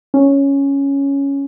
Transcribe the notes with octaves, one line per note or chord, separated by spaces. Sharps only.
C#4